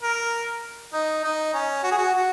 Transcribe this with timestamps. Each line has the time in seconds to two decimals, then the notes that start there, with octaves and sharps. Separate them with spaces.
0.03 A#4
0.93 D#4
1.24 D#4
1.54 C#4
1.83 F#4
1.91 G#4
1.98 F#4
2.14 F#4